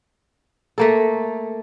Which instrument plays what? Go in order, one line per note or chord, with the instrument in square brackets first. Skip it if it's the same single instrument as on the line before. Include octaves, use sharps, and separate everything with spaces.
[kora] A3 A#3 A4